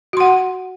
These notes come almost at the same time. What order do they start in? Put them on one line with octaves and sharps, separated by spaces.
F#4 C6 F#5